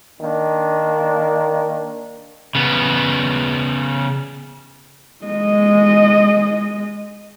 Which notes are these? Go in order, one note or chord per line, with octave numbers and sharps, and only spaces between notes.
D#3 A#3 D4
C#3 B3
G#3 D#5